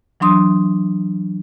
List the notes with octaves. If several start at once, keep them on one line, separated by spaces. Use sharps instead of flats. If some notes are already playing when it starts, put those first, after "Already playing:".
E3 F#3 D4 C6 D#6